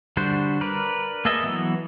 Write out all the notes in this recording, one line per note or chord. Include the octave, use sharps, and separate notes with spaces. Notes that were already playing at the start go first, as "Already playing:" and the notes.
D3 G3 D4 F#4 C5
A#4 B4 D5
A#3 G#4 A4 D#5 E5
E3 F#3 B3